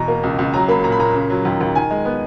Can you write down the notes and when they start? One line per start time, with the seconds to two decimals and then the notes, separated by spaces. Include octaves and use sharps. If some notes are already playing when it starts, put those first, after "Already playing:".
Already playing: E2 B2 A#5
0.08 A#3
0.23 C#2
0.39 C#2
0.54 F#3 A#5
0.68 A#3 B5
0.84 A#2 A#5
0.92 B5
0.99 A#2 A#5
1.14 C#3
1.30 F#3
1.45 D#2
1.60 D#2
1.75 D#3 G#5
1.91 G#3
2.05 B3